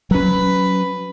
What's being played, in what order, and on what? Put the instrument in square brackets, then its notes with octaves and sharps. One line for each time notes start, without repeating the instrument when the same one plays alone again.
[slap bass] F#3 C#4 [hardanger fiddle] B4